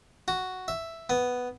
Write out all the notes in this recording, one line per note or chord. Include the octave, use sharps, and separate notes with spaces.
F#4
E5
B3